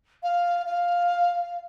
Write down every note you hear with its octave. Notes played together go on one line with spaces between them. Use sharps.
F5
F5